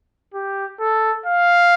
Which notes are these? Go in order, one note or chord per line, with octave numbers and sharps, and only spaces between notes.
G4
A4
F5